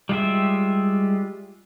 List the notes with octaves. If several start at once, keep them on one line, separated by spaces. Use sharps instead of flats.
G3 G#3 F4 G4 E5